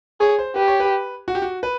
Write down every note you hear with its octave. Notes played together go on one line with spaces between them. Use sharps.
G#4 C#5
C5
G4 B4
C#5
B4
F#4
G4
F#4
B4